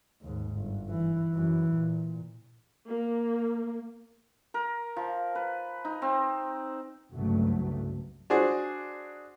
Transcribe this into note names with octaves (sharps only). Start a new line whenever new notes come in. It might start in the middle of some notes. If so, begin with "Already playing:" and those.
D#2 G#2
G1
E3
F#2 E3
A#2
A#3
A#4
F3
B4
D#4
C4
F#1 C2 G2 F#3 A3
D4 F#4 G#4 C5